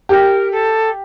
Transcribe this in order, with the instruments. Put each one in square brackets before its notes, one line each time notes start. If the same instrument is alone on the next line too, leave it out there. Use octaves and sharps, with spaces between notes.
[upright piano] G4 [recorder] A#4
[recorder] A4